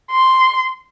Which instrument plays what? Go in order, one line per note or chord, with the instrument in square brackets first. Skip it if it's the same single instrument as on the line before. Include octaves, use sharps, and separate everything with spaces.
[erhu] C6